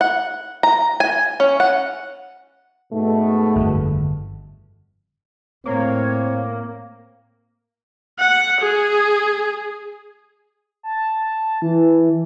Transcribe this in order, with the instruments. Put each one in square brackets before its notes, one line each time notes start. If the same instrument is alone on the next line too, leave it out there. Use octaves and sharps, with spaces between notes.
[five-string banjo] F#5
A#5
G#5
C#4
F#5
[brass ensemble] G#2 B2 A3
[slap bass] G1 F2
[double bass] A2 [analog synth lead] A#3 [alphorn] C4 [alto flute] C#5
[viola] F#5
G#4
[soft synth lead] A5
E3